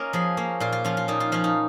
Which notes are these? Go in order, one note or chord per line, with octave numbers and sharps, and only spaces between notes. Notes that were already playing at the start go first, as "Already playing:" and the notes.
Already playing: A#3 C#4 F4 A#4 D#5
F3 G#4
A#3 C#4
A#2 F4
F4
F3 C#4 F4
F4
A#2 D#4
F4
F3 C#4 F4
D#4